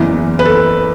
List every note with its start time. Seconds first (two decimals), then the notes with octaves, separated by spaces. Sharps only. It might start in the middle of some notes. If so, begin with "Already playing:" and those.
Already playing: F#1 E2 E3
0.39 B4
0.45 A4